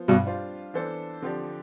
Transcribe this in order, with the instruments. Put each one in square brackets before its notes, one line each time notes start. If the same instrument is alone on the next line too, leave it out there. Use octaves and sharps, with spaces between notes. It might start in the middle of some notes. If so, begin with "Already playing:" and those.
Already playing: [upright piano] F3 B3 F4 C5
[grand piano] G2 B2
[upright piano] G3 D4 F4 C5 F5
E3 B3 D4 A4 C5
D3 F3 C4 G4 D5